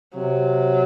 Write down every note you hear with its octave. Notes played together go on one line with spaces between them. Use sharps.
C3 F#3